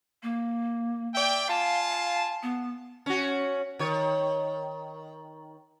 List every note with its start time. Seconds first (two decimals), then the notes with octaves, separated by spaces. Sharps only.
0.23 A#3
1.15 D5 E5 G5
1.48 F4 F5 G#5 A5
1.91 F5
2.43 B3
3.06 C#4 F#4
3.79 D#3 C#5